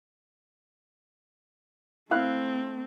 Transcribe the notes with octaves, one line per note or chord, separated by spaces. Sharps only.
A3 C4 E4 F5 F#6